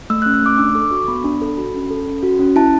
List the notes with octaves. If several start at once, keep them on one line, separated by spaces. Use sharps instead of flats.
A3 E6
C#4 F#6
E6
A3 D6
D4 E6
A4 D6
F#4 C#6
B3 B5
D4
A4
F#4 B5
C#4
A4
C#4
F#4
C#4
E4 A5